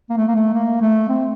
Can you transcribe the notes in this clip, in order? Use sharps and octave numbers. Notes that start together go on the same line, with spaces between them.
A#3
A3
A#3
A3
A#3
A3
C4